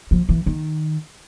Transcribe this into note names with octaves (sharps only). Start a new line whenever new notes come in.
F3
E3
D#3